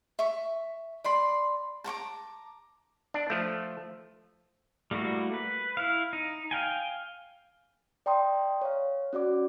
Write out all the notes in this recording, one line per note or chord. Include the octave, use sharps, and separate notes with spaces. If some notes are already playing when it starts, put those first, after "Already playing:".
E5 C#6
D5 B5 C6
A5 A#5 C#6 D6
D4
F3 A3
G3 A3 A#3 E4 F#4
B4
E4 F5
D#4
F5 G5 G#5
D5 G5 A#5 C6 D#6
C#5 F5
C#4 F#4 D5 D6